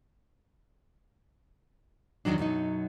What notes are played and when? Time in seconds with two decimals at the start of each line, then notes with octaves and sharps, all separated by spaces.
2.25 E2 B2 D#3 F#3 D4
2.38 F#2 B2 F#3 D#4